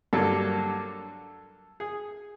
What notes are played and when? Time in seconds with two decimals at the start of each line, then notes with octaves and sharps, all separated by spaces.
0.13 G2 D3 F#3 A#3 A4
1.80 G#4